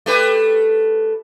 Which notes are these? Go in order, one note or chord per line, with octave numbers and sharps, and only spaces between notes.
A3 G4 B4